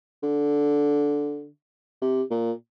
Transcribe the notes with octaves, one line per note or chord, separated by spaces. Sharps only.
D3
C3
A#2